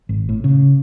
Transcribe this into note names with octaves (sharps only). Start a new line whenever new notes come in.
G#1
A2
C#3